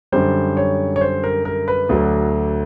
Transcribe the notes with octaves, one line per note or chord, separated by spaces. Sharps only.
F#2 D3 G3 C5
C#5
C#5
C5
A#4
A#4
B4
D2 D3 F#3